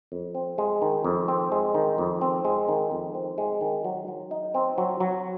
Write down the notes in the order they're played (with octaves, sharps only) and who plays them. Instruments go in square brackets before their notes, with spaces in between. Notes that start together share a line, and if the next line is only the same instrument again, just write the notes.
[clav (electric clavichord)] F2
C4
G#3
D#3
F2
C4
G#3
D#3
F2
C4
G#3
D#3
F2
C4
G#3
D#3
F#3
F#3
D#4
C4
F#3
F#3